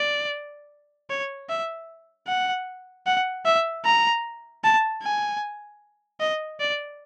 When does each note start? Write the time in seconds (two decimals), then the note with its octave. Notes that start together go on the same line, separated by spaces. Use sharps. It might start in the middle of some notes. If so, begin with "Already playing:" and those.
Already playing: D5
1.10 C#5
1.50 E5
2.28 F#5
3.07 F#5
3.46 E5
3.85 A#5
4.64 A5
5.03 G#5
6.20 D#5
6.60 D5